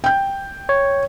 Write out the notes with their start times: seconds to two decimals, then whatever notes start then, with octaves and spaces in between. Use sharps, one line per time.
0.04 G5 G6
0.69 C#5